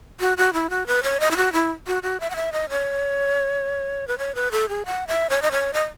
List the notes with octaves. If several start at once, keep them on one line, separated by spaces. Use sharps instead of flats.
F#4
F#4
E4
F#4
B4
C#5
D#5
E4
F#4
E4
F#4
F#4
E5
F#5
E5
D#5
C#5
B4
C#5
B4
A4
G#4
F#5
E5
C#5
D#5
C#5
D#5